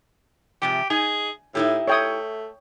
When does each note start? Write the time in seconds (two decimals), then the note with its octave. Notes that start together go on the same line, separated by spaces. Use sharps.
0.62 G#2 C3 F3 G4
0.90 D#4 G#4 G#5
1.55 A2 D#4 E4 G4
1.87 A3 C#5 G5 D#6